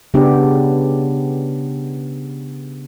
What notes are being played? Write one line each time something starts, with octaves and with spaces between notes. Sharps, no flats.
C#3 B3 D4 G4